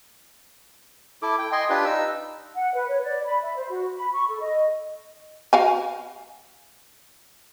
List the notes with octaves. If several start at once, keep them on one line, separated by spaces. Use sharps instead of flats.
E4 A4 D6
G5
D#5 G5 G#5 C6
D4 F4 G4 B4
D#4 E6
F#5
B4
C#5
D5
B5
E5
C5
F#4
B5
C#6
A4
D#5
F#4 F5 G#5